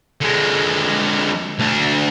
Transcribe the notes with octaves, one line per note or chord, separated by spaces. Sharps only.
D3 G#3
D2 D4